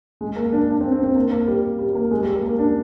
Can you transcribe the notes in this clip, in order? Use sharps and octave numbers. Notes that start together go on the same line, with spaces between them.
G#3
A#3
D4
D4
C4
C4
C4
A#3
A#3
G3
G3
A#3
G#3
G3
A#3
A#3
D4